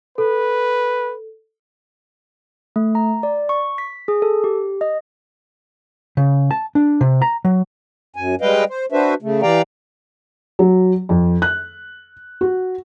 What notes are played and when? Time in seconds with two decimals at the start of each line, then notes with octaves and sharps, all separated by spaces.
0.18 A4 B4
2.76 A3
2.95 A#5
3.23 D5
3.49 C#6
3.78 B6
4.08 G#4
4.22 A4
4.44 G4
4.81 D#5
6.17 C#3
6.51 A5
6.75 D4
7.01 C3
7.22 A#5
7.45 F#3
8.16 F#2 G#5
8.41 G3 G#3 B4 D#5 F5 G5
8.69 C5
8.92 D4 F#4 B4 C5 E5
9.22 C#3 A3
9.43 E3 G4 D5 F5 G5 A#5
10.59 F#3
11.09 F2
11.42 F#6
12.41 F#4